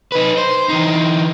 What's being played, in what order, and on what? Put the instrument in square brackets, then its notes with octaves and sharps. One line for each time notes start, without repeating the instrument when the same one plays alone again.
[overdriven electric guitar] D#4 B4
C5
E3 D#4